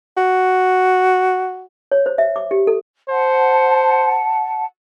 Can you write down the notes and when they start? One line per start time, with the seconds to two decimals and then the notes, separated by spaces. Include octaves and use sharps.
0.17 F#4
1.92 C#5
2.06 C5
2.18 E5
2.36 D6
2.51 G4
2.67 A4
3.09 C5 F#5 A5